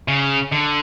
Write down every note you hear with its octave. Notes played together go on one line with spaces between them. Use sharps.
C#3
D3